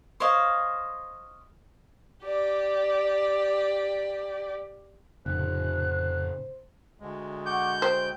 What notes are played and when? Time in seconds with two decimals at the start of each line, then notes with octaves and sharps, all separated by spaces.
0.20 C5 C#5 D#5 F5
2.25 G4 D5
5.26 F1 A2 C#3 C5 F#6
7.00 D2 G#3
7.46 F#5 C#6 D6 G6
7.82 C5 G5